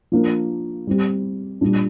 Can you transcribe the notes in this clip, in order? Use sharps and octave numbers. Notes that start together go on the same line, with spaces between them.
F3 A#3 D4
G3 C4 G4
A#2 G3 D4